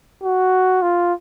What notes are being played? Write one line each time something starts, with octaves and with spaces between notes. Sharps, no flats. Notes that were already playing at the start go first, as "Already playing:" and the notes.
F#4
F4